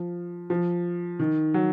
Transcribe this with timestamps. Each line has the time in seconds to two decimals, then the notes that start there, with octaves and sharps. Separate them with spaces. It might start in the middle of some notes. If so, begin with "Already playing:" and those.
Already playing: F3
0.50 F3
1.20 D#3
1.54 F#3